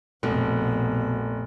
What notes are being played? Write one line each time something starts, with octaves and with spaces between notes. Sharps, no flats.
F1 A#1 B2